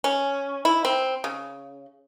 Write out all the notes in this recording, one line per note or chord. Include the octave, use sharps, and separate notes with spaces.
C#4
E4
C4
C#3